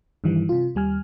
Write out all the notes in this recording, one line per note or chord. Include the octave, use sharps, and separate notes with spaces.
G2 D#3 E3 G3
C3 F4
D#2 G3 G#5 F6